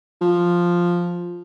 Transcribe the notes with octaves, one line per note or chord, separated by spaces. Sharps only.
F3